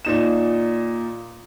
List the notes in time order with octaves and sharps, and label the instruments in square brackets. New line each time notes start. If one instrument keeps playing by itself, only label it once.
[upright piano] A#2 D#4 E7